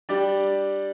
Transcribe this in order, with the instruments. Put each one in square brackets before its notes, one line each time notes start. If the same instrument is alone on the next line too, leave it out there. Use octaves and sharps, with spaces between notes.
[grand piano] G3 D4 G4 D5